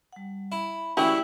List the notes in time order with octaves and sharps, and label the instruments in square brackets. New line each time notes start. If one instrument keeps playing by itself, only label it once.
[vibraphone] G3 F#5
[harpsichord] E4 [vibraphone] B5
[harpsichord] E3 G3 A3 [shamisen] C#4 F#4 G4 [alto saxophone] E4